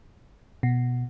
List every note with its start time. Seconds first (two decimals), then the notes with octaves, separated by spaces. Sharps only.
0.63 B2